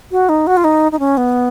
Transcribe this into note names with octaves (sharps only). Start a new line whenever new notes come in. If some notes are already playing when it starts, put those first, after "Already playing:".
F#4
D#4
F#4
F4
D#4
D#4
C#4
B3